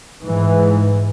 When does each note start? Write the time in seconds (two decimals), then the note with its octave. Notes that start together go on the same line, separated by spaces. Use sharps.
0.23 G#2 E3